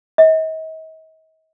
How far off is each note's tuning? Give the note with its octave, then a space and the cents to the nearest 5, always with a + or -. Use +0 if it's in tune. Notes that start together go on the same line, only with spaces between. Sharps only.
D#5 +40